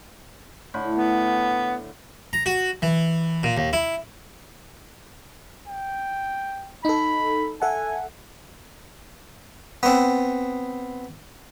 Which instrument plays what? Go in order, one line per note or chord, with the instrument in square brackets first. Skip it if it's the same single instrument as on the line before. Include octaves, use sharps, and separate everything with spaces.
[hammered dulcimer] A2 D3 B5
[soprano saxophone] B3
[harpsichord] A#5
F#4
E3
A#2
D#2
E4
[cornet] G5
[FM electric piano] D#4 A4 [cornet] B5
[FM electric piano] A4 E5 F#5 [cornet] G#5
[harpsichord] B3 C4